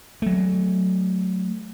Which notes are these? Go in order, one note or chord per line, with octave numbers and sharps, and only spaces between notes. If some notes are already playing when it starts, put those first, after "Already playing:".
F#3 A3